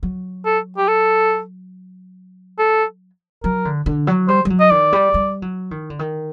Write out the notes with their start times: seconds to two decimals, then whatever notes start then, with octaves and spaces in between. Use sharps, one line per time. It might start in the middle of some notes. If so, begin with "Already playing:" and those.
0.03 F#3
0.46 A4
0.78 G4
0.88 A4
2.59 A4
3.43 F#3 A#4
3.65 D3
3.86 D3
4.07 F#3
4.28 G3 C5
4.45 G3
4.50 F#3
4.60 D#5
4.71 D#3 D5
4.93 G3
5.14 G3
5.42 F#3
5.71 D#3
5.90 D3
5.99 D#3